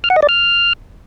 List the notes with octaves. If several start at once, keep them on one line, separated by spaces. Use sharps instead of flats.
F6
F#5
D#5
D5
F6